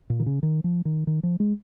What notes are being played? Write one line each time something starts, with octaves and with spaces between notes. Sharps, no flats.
A#2
D#3
C#3
D#3
F3
D#3
D#3
F3
G#3